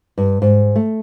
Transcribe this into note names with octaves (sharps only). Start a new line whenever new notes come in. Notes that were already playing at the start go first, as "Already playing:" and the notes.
G2
G#2
A3